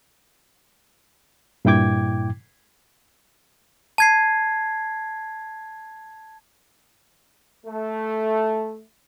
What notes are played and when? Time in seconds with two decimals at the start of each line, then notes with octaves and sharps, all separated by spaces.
1.65 G2 A#2 E4 G5 D6 G#6
3.98 A5 G#6 C7
7.66 A3